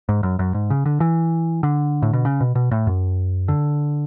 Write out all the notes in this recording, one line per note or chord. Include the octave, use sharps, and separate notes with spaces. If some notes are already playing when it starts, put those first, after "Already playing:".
G#2
F#2
F#2
G#2
C#3
D3
E3
D3
A2
B2
C#3
B2
B2
A2
F#2
D3